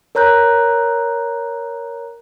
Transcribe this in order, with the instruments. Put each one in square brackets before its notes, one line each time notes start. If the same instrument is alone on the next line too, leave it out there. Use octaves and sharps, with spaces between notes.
[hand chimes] A#4 C#5 A#5 F#6 G6